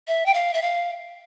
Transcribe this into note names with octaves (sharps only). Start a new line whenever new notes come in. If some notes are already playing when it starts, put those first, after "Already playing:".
E5
G5
F5
E5
F5